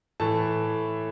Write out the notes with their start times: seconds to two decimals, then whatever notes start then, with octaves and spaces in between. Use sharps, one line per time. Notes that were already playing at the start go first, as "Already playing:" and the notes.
0.20 A2 E3 A3 A5